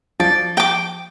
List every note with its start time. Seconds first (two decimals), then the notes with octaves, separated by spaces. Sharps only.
0.20 F3 D5
0.57 G5 D6